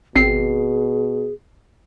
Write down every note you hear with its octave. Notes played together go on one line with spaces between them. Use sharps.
G#1 B2 C4 G#4 C7